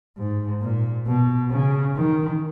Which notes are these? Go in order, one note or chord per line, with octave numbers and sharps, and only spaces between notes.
G#2
A#2
B2
C#3
D#3